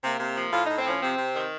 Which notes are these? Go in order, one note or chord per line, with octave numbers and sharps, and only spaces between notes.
C3 A#3
C3
F3
A2 F4
A2 D#4
C4
F3 C#4
C3 C4
C3
D#3